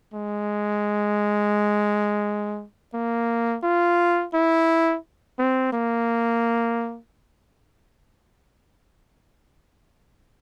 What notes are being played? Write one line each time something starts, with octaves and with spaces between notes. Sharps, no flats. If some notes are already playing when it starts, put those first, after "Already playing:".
G#3
A#3
F4
E4
C4
A#3